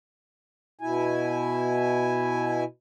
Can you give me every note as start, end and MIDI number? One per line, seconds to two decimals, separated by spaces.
0.81 2.64 47
0.81 2.64 64
0.81 2.64 80